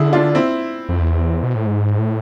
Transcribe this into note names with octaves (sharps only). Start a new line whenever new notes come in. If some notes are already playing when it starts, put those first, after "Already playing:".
Already playing: D3 E4 G#4
D4 F4
C4 E4
F2
E2
B2
A2
G#2
A2